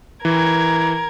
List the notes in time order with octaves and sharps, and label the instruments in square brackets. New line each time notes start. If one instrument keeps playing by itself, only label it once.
[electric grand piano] E3 [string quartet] A#4 G#6